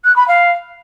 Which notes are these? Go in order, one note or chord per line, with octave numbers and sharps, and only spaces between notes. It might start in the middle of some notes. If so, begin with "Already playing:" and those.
F#6
B5
F5